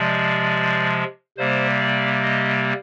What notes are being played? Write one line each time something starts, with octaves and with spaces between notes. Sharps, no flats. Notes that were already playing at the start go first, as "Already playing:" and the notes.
Already playing: C3 F3 G#3 D5
C3 G3 A#3 C5
D5
D#5